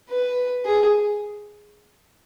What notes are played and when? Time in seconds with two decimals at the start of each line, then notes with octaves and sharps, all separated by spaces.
0.10 B4
0.65 G#4